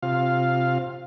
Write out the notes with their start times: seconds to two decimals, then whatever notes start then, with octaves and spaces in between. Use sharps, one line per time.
0.03 C3 F4 F5